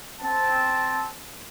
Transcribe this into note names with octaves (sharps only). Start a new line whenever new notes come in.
C4 A5